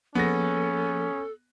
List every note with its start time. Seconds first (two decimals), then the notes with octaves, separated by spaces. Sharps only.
0.15 F3 A#3 B3 C#4 G#4 A4 A#6